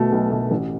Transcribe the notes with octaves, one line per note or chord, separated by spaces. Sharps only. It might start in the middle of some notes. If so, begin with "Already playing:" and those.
Already playing: B2 A3
B1
B2 A3
A1